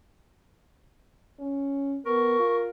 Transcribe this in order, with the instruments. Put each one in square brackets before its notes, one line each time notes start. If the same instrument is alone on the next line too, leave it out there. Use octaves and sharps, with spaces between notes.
[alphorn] C#4
[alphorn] B3 [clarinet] A#4 [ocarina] C#6
[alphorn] F4